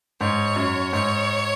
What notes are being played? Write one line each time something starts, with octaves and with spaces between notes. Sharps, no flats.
G#2 C#5
F#2
G#2 C#5